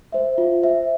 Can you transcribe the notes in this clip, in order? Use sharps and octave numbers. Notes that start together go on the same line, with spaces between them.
C5 E5
F4
C5 E5